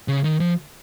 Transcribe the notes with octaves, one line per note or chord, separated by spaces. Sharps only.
C#3
D#3
F3